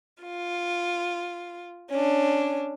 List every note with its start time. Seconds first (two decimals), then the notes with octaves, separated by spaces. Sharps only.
0.23 F4
1.91 C#4 D4